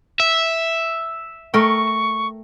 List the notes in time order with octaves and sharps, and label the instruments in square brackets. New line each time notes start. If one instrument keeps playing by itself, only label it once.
[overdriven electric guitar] E5
[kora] A3 A#4 G5 [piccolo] C#6